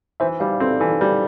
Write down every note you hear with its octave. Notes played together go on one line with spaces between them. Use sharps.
E3 C5 E5
G3 D5 F5
C4 A4
E3 A4
G3